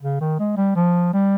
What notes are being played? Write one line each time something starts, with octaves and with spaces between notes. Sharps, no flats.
C#3
D#3
G#3
G3
F3
G3